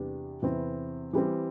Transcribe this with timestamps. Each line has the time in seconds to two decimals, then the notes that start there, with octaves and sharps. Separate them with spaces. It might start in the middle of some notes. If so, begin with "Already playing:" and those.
Already playing: E2 C3 G3 D4 G4
0.42 E2 C3 E3 C4 E4
1.13 E3 G3 C4